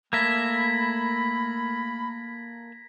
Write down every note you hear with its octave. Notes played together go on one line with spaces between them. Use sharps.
A3 A#3 A4 E5 B5 G#6 A#6 B6